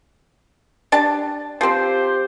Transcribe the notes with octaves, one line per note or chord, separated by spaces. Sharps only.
D4 G4 A5
F3 C4 G4 C5